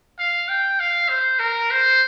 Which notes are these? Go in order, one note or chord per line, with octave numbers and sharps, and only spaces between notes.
F5
G5
F5
C5
A#4
C5